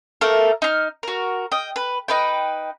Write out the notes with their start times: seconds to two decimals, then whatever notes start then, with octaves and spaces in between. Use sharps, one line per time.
0.21 A3 A#3 A4 A#4
0.62 D#4 F6
1.03 F#4 A#4
1.52 D#5 G5
1.76 B4
2.08 D#4 B4 G5